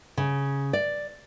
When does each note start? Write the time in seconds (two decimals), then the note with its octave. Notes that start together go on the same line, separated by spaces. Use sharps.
0.17 C#3
0.73 D5